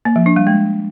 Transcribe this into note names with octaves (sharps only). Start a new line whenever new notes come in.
A#3
F3
D4
G3
G#3